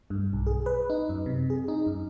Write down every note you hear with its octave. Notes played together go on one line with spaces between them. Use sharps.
G2
B1
G#4
B4
D#4
F#2
C3
G#4
D#4
F#2